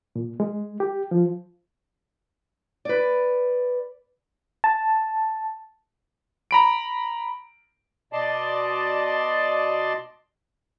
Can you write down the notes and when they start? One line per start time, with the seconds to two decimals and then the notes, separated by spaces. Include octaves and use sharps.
0.16 A#2
0.40 G#3
0.80 G4
1.11 F3
2.85 B4 D5
4.64 A5
6.51 A#5 B5 D7
8.13 B2 D5 D#5 A5 C6